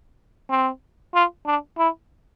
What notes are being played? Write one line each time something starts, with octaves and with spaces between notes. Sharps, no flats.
C4
F4
D4
E4